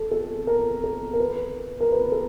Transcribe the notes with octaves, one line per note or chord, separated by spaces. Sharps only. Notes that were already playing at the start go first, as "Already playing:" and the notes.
Already playing: A4
A4
A#4
A4
A#4
B4
A#4
B4
A4